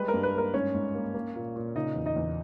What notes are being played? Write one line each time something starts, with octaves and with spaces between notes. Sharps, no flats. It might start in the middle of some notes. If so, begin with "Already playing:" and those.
Already playing: G3 G#3 B4
A#4
G2
B4
A#3 A#4
G#2 C#4 C#5
G#2
A#3
A#3
A#2
A#2
C#3 D#4 D#5
E2
D#4 D#5
E2